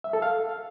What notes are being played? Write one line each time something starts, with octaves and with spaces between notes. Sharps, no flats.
E5
A4
F5